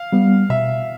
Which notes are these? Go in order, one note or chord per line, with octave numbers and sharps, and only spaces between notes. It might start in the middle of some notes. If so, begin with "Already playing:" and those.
Already playing: F5
G3 B3
B2 E5